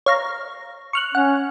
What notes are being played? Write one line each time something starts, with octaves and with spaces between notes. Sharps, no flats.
C#5 F5 A#5
C#6 F6 F#6
C#4 F#5